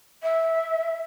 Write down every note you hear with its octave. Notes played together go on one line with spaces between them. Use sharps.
E5